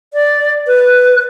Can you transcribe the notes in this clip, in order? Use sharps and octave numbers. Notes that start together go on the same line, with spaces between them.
D5
B4